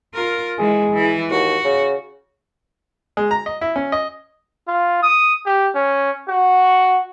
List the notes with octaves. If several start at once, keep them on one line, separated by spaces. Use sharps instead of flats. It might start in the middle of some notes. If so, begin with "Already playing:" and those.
F4 A#4
E3 G#3 G#4
E3
D#2 F#4
C#3
G#3
A#5
D#5
E4
C#4
D#5
F4
D#6
G4
C#4
F#4